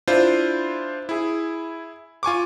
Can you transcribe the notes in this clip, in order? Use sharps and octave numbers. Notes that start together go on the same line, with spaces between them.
D4 E4 F4 C5
E4 G#4
F4 G#5 C#6 D6